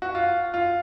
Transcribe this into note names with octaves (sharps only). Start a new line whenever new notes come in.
F#4
F4
F4